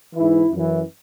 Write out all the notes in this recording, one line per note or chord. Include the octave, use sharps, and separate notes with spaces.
G#2 E3 E4
F#2 E3